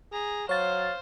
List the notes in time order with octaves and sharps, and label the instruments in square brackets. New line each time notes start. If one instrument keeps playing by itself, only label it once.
[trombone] G#4 [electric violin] A#5
[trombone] F#3 [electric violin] C5 [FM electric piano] C#5 A6 [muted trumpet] F5